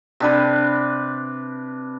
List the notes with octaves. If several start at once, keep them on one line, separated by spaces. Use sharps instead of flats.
C3 D4 B4